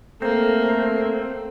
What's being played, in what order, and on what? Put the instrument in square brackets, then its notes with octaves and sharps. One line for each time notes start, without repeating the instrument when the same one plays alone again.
[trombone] A3 [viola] A#3 [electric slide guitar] C4 [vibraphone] A4 C5 A#5